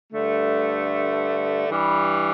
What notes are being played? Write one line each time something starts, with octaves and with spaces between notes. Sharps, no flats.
G2 D3 A3
G2 E3 G3